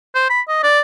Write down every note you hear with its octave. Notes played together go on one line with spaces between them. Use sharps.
C5
B5
D#5
D5